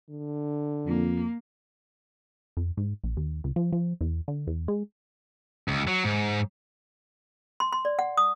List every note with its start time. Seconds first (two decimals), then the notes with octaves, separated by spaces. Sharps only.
0.10 D3
0.86 F2 A#3
2.57 F2
2.77 G#2
3.04 A#1
3.17 D#2
3.44 C#2
3.56 F3
3.73 F3
4.01 E2
4.28 D3
4.47 E2
4.68 G#3
5.68 C#2
5.88 F#3
6.05 G#2
7.60 C6
7.73 C6
7.85 D5
7.99 F#5
8.17 D#6